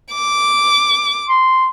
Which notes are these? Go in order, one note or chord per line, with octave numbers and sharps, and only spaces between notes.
D6
C6